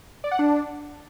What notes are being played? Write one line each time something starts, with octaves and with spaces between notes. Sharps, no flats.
D5
F#5
D4